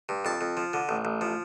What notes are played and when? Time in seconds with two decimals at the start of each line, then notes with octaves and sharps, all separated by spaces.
0.09 G2
0.25 F2 A5
0.41 F2
0.57 F3
0.73 D3
0.89 A1
1.05 A1
1.21 F3